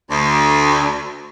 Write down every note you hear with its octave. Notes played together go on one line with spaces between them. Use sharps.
D2